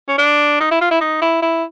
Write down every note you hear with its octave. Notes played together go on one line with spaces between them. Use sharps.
C#4
D4
D#4
E4
F4
E4
D#4
E4
E4